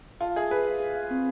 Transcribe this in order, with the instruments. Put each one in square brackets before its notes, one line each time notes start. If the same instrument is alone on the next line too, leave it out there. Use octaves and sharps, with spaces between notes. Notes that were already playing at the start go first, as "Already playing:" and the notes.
[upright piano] F4 [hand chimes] A5
[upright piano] G#4 [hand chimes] E5
[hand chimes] G#4 [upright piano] B4
[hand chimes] E5
G#4
F5
C4